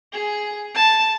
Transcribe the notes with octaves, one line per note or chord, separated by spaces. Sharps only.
G#4
A5